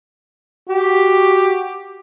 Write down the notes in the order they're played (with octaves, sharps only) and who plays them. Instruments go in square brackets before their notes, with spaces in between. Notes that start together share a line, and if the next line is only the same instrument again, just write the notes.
[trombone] F#4 [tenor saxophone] G4